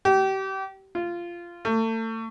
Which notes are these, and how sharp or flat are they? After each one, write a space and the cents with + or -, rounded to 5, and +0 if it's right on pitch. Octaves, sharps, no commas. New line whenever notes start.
G4 -30
F4 -15
A3 +35